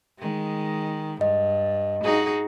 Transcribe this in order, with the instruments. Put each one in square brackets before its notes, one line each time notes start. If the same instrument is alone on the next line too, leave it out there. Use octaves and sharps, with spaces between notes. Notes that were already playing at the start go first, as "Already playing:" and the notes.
[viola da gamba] D#3 G#3
[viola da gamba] G2 [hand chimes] D#5
[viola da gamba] D#4 F#4 G#4